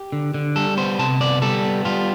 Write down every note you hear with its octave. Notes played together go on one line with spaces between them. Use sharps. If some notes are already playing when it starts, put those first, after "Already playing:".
Already playing: G4
D3
D3
G3 A4
B3 C5
C3 A5
B3 D5
G3 A4
B3
G3 F4